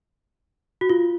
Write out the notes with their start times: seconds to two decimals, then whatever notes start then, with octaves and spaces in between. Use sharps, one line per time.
0.81 F#4
0.89 F4